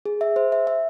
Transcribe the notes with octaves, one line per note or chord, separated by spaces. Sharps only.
G#4
E5
C5
E5
E5